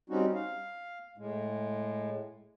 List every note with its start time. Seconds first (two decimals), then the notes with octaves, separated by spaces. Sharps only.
0.10 G3 C4 C#4 D#4 F#4
0.34 F5
1.18 A2 G#3